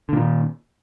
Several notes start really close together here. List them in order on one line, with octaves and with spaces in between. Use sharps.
D3 A#2 D#3